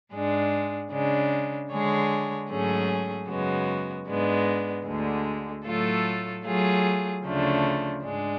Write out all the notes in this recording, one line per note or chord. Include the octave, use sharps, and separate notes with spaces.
G#2 G#3 D4
C#3 G#3 D4
D3 G#3 D4 G#4 C#5
G#2 F#3 A3 C#4 G#4
F#2 C#3 G#3 B3 F#4
G#2 G#3 B3 D4
D2 D3 G#3
A2 F#3 A3 F4 A4
F#3 A3 F4 G#4
D2 C#3 F3 A3 D4
G#2 G#3 D4